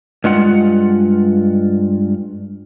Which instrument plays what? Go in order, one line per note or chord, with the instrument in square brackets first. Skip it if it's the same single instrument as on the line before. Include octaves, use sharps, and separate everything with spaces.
[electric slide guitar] G2 G#3 F4 F#5